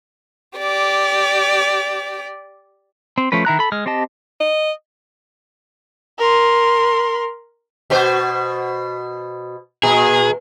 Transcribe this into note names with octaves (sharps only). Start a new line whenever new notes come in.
G4 D5
C4
F3 A3 C#4 B4
D#3 E4 A#5 F#6
A4 B5
G#3 F6
C4 G4 D#5 A5
D#5
A#4 C6
B2 F#4 C5
A#2 G#4